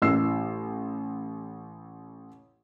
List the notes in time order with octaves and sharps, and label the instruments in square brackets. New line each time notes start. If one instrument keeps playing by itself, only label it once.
[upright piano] A1 E6 C7